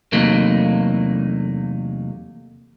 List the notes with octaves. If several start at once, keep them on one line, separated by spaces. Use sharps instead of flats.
E2 C3 F#3 A3 A#3 D#4